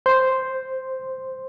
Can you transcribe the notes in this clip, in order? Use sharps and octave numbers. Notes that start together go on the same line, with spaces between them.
C5